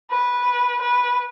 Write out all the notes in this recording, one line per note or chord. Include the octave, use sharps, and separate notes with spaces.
B4
B4